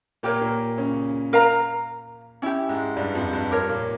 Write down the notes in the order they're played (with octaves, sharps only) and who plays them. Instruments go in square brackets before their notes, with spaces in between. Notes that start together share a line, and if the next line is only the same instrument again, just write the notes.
[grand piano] A#2 A#3 [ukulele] G4 A#4 C#5
[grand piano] A#2 A#3
C#3 C#4
[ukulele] A#4 F5 A#5
C#4 E4 G4
[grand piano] G#2 G#3
G2 G3
F2 F3
G2 G3
[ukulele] G4 A#4 C#5
[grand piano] A#2 A#3